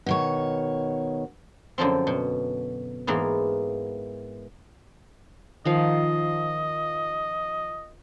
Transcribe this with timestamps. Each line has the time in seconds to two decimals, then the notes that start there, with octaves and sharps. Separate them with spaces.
0.06 B2 D#3 C#5
1.78 F#2 D3 F3 C4
2.07 B2
3.07 G#2 E3 A#3 B3
5.65 D#3 F3 D#5 F5